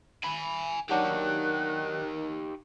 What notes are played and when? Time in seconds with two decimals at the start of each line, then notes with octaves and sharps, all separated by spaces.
0.24 G#5 B5
0.90 D#3 F#3 D4 D#4 F#4 G4 F#6